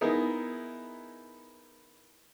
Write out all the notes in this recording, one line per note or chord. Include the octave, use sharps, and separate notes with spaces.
B3 D#4 E4 G#4 A#4